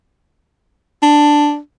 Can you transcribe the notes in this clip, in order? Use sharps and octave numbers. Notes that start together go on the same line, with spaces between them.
D4